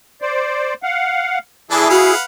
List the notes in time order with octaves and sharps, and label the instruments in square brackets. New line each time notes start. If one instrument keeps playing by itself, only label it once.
[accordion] C5 D5
F5 F#5
[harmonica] E3 D4 A4 [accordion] E4 G#4
[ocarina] F#4 [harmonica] B4 F5 F#5